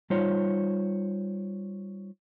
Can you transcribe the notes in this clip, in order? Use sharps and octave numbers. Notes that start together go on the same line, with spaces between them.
G3 D#4 F4 C5 C#5